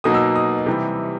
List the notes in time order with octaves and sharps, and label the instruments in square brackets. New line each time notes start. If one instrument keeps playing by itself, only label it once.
[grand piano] B2 F#3 A#3 D#4 D#6
E6
D#6
C3 E3 G3